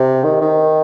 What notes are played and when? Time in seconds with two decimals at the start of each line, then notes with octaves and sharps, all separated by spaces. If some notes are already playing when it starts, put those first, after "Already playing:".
Already playing: C3
0.24 D#3
0.41 D#3